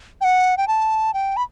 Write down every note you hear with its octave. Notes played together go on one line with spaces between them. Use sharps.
G5
F#5
G5
A5
G5
B5